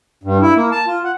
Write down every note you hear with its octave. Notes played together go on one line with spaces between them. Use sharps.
G2
E4
A#3
A5
F4
F#5